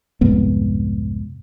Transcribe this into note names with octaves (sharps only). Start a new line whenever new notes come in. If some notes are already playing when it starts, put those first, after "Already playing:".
C2 F2 G#2 B3